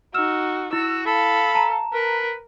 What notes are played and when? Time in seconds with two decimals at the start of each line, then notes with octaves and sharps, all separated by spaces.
0.14 D#4 F#4 E6 F6 E7
0.73 E4 F#4 E6
1.06 A4 F5 B5
1.55 A5 A#5 E7
1.93 A#4 B4